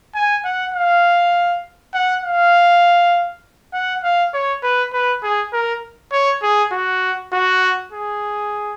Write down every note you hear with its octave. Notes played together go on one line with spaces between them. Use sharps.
G#5
F#5
F5
F#5
F5
F#5
F5
C#5
B4
B4
G#4
A#4
C#5
G#4
F#4
F#4
G#4